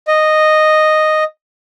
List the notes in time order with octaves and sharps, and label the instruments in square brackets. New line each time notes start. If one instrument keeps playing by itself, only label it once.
[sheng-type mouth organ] D#5